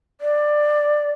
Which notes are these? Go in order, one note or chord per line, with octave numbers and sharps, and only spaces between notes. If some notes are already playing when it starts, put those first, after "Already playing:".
D5